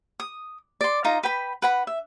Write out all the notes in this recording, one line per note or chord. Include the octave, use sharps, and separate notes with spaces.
D#6
D5 C6
D#4 F4 A#5
B4 G5 B5
B4 F#5 B5
E5